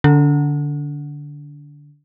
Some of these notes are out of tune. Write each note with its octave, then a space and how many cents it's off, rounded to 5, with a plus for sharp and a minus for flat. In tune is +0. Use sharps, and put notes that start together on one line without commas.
D3 +0 D4 -40